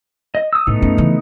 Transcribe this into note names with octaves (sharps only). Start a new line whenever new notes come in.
D#5
D#6 E6
A2 A3 B3 D#4
F#2 C#4
C#3 E3